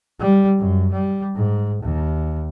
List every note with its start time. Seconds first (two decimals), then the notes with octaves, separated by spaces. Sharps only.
0.20 G3
0.59 F#2
0.92 G3
1.36 G#2
1.83 D#2